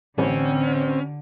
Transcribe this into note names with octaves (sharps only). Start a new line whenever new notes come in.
A1 D3 C4 C#4